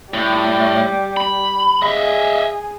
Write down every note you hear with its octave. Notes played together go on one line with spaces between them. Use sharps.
A2 G3
B5
G#4 D#5 E5